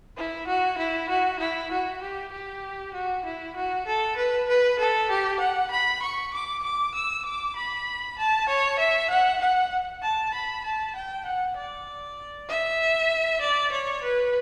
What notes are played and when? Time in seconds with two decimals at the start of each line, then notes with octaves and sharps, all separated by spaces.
0.17 E4
0.47 F#4
0.78 E4
1.09 F#4
1.40 E4
1.71 F#4
2.01 G4
2.32 G4
2.94 F#4
3.25 E4
3.56 F#4
3.87 A4
4.17 B4
4.48 B4
4.79 A4
5.10 G4
5.40 F#5
5.71 B5
6.02 C#6
6.33 D6
6.63 D6
6.94 E6
7.25 D6
7.56 B5
8.18 A5
8.48 C#5
8.79 E5
9.10 F#5
9.41 F#5
10.02 A5
10.34 B5
10.64 A5
10.95 G5
11.25 F#5
11.57 D5
12.49 E5
13.41 D5
13.72 C#5
14.03 B4